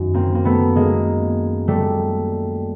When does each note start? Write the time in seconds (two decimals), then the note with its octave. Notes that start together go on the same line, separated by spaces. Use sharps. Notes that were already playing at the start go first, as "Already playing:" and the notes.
Already playing: F#2 D#3 F#3
0.14 A#3 C4
0.35 A#3
0.45 A3 B3
0.76 G#3 A#3
1.68 G3 A3